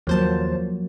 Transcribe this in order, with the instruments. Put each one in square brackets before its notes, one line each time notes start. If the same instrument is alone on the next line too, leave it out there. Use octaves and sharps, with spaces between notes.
[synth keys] D#2 C5 A5 [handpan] F3 F#3 A#3